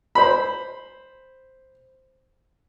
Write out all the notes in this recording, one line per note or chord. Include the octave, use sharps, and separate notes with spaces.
C5 B5